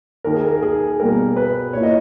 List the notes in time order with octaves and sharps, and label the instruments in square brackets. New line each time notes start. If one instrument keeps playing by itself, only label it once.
[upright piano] D#2 D#3 A#3 [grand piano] A#4
[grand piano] G#4
A#4
G#4
[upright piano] B2 G3 A#3 [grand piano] A#4
[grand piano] B4
[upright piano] A#2 A#3 E4 [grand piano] C#5
[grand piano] D#5